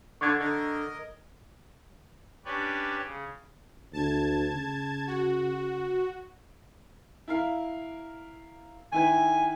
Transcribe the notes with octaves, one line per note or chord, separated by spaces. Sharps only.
D3 C#6 D6 G#6
D3 A#4 D#5
C#4 D4 G4 B4 C#5 D5
C#3
D2 A5 G#6
C#3
F#4
E4 A#4 F5
D#3 E4 B4 G#5